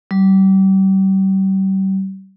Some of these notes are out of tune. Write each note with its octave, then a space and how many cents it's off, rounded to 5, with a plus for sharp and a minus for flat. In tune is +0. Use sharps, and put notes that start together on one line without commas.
G3 -35